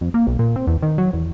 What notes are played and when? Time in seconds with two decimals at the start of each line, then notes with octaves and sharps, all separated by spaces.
0.01 F2
0.14 A#3
0.27 B1
0.39 A#2
0.56 C4
0.67 E2
0.82 D#3
0.98 F#3
1.13 E2